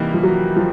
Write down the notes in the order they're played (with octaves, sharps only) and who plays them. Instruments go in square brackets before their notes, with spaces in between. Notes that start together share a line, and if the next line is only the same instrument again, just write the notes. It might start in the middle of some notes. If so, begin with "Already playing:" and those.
Already playing: [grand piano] C3 E3 G3 A#3 D#4
[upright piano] F3
F#3
F3